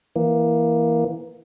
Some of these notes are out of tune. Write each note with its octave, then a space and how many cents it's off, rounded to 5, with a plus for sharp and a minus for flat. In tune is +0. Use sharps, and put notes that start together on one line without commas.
E3 +0 A#3 +10